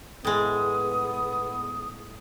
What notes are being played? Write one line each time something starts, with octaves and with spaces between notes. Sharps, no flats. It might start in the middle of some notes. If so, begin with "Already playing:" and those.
A2 G#3 B3 D#6